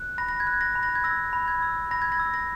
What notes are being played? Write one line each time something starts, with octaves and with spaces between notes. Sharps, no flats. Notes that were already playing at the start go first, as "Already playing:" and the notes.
Already playing: F#6
B5 A#6
A#6
G#6
F#6
A#6
B5
A#6
G#6
E6 A#6
B5
G#6
E6
B5 A#6
G#6
A#6
E6
A#6